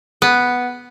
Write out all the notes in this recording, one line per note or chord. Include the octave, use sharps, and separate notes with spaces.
B3